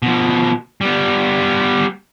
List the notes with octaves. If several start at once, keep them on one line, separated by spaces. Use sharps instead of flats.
B2 F3
G3 B3